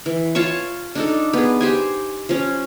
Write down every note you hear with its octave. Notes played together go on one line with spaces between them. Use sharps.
E3
F4 C#5 A5 C#6
D4 D#4 A4
B3 G#4
G4 C5 G#5
F3 C#4